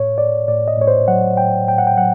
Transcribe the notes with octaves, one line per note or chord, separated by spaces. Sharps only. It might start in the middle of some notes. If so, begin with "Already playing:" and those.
Already playing: A2 C#5
A2 D5
A2 D5
D#5
A2 C#5
C5
F#3 F#5
A2 G5
A2 G5
F#5
G5
F#3 F#5